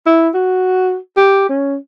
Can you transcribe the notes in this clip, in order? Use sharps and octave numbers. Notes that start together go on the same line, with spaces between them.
E4
F#4
G4
C#4